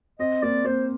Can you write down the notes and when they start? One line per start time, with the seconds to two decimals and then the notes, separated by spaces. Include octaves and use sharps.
0.19 C4 D#5
0.42 A#3 D5
0.65 A#3 C5